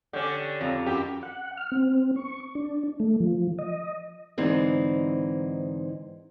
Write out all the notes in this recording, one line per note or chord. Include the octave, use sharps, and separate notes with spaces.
D3 C#4 G4
F2 A#5
F#2 G4
F#5
F6
C4
C#6
D4
A3
F3
D#5
G#2 D3 E3 C4 D#4